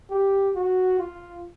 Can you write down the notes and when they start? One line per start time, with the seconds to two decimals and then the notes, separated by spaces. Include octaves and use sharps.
0.10 G4
0.55 F#4
0.99 F4